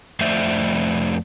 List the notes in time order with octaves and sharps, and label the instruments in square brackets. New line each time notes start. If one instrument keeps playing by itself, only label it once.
[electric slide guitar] F2 A3 C5 D5 E5